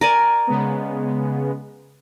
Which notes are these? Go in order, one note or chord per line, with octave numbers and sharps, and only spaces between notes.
A#4 D5 G#5
C#3 G#3 B3